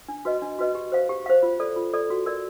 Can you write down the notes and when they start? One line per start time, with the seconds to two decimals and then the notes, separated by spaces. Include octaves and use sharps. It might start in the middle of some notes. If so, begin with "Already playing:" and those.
0.08 D4
0.25 F#4 B4 D#5
0.42 D4
0.59 F#4 B4 D#5
0.75 G4
0.92 C5 F5
1.09 G4
1.26 C5 F5
1.43 F4
1.60 A4 D5
1.76 F4
1.93 A4 D5
2.10 F#4
2.26 A#4 D5